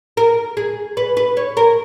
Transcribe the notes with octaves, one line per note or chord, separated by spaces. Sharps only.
A#4
G#4
B4
B4
C#5
A#4